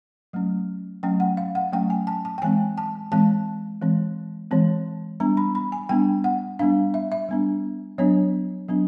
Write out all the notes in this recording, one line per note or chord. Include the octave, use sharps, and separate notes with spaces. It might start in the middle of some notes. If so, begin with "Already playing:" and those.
F#3 A3 C#4
F#3 A3 C#4 G5
F#5
F5
F#5
F#3 A3 C#4 G5
G#5
A5
A5
G5
E3 G#3 C4 G#5
A5
E3 G#3 C4 A5
E3 G#3 C4
E3 G#3 C4
G3 B3 D4 A#5
B5
B5
G#5
G3 B3 D4 G5
F#5
G3 B3 D4 F5
E5
E5
G3 B3 D4
F#3 B3 D4 C#5
F#3 B3 D4